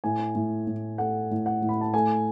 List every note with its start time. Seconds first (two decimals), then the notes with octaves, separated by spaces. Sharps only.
0.04 A2 G#5
0.35 A2
0.67 A2
0.98 A3 F#5
1.31 A2
1.46 F#5
1.62 A2
1.69 B5
1.81 A5
1.93 A3 G#5